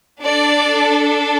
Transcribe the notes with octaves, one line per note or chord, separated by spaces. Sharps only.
D4 A4 D5